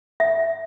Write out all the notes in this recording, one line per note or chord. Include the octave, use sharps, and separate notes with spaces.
E5